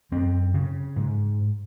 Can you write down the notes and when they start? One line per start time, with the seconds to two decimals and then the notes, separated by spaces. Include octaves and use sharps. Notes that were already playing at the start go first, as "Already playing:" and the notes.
0.12 F#2 C4
0.54 C#3
0.96 G#2